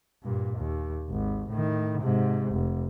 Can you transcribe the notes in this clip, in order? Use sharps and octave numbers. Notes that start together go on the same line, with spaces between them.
G2 A#2
D#2
G#1
A2 D#3
G#2 C3
F1